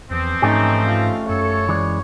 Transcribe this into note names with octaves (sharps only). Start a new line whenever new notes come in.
E2 E3 F3 C4
G#2 A3 C#4 D#4 G4
F4
F#2 A4 C#5
E3 G#3 D5